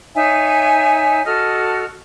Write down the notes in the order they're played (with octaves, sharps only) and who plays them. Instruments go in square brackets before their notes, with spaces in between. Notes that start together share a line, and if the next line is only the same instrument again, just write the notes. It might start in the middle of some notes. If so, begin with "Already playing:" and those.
[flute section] D#4 C#5 E5 G#5
F#4 A4 D#5 F6